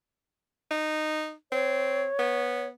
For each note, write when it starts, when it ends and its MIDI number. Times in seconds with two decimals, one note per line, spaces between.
0.71 1.32 63
1.52 2.05 60
1.52 2.68 73
2.19 2.71 59